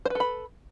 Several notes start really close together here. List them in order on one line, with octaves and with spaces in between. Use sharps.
C5 B4 A4 B5